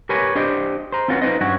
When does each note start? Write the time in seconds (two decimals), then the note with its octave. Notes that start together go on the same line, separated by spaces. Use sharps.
0.09 G4 A#4 B4 C#5 G#5
0.35 D4 G4 C5 D#5
0.92 C5 A#5
1.08 C4 C#4 F4 F#4 B4
1.22 D#4 B4 C5 D#5
1.41 G2 F#3 C#4 F#4